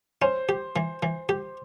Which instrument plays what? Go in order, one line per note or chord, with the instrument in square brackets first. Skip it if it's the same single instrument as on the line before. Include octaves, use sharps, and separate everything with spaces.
[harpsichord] C#4 [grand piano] C5
[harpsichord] G4
E3
E3
G4